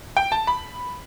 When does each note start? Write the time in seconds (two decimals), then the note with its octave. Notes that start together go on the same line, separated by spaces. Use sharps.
0.17 G5
0.32 A5
0.47 B5